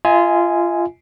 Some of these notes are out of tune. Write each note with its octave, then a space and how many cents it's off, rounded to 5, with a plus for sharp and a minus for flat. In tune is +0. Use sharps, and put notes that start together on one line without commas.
F4 -20 D#5 +40 G#5 +0